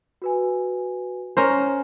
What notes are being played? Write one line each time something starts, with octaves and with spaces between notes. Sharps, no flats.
F#4 B4 G#5
C#4 A#4 C5